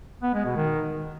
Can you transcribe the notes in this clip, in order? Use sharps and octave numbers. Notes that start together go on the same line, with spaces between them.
B3
G#3
B2
D#3